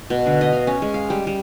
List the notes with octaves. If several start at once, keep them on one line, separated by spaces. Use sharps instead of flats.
B2
D3
D#5
F5
C#4
G#3
F5
G3
G3